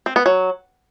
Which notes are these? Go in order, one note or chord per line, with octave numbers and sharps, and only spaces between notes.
C4
B3
F#3